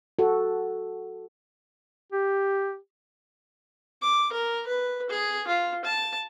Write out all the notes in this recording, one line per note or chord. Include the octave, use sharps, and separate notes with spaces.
F#4 A4
G4
D6
A#4
B4
G#4
F4
A5